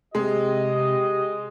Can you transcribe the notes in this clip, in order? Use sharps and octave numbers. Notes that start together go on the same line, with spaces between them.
C3 G#3 G4 D#5